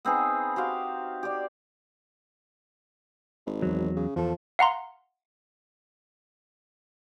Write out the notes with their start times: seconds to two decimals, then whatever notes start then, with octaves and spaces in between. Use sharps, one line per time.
0.05 B3 C4 D#4 G#4
0.56 F#4 G4 C5 F5
1.23 G4 D5
3.46 G#1
3.62 E2 F#3
3.96 C#3
4.16 E2 F3 A4
4.59 F5 F#5 A#5 C6